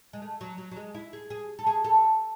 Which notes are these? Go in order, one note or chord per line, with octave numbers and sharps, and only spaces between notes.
G#3
A3
F#3
F#3
F#3
G#3
E4
G#4
G#4
A4
G#4
A4